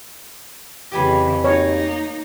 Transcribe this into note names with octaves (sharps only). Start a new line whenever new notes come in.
F2 C#3 E3 G4 G#5 B5
A#3 D#4 C#5